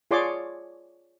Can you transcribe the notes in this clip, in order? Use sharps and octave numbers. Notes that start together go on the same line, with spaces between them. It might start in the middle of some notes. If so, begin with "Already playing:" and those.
F4 G#4 C#5 D5 C6 D6